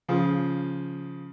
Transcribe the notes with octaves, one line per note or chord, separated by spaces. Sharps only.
C#3 F3